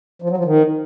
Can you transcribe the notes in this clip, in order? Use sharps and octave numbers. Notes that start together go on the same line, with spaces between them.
F3
F#3
F3
D#3